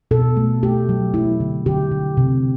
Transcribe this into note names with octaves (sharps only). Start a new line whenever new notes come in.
B2 A4
A3
A3 G4
F#3
A3 E4
D3
D3 G4
D3
C3